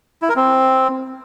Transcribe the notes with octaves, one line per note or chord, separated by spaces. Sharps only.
E4
A#4
C4